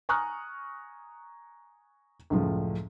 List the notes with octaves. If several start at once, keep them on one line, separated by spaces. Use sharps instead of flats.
G#5 A#5 C#6 D#6 F6 F#6
C#2 F#2 A2 C#3 F3